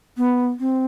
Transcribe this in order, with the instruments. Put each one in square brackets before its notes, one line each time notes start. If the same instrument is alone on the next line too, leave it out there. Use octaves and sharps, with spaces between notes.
[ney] B3
C4